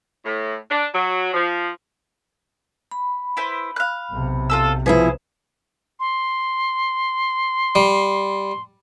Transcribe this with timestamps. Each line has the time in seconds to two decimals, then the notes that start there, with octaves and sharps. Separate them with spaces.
0.24 A2
0.70 D4
0.93 F#3
1.33 F3
2.91 B5
3.37 E4 B4 C5
3.76 F5 F#6
4.12 B1 C3
4.50 F4 A4 E6
4.86 B2 F3 E4 G#4 B4 C5
6.00 C6
7.75 G3